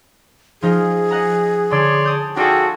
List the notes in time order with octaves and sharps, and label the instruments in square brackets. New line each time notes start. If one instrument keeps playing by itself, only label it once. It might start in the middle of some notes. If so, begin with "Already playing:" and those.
[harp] F3 D#4 F4 [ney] G#4
[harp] D#5 F#5 A#5
[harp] D3 E6 [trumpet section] C#5 D5 C6
[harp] A5 D#6 G6
[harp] D#4 F4 D5 [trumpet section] F#4 G#4 A4 [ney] G5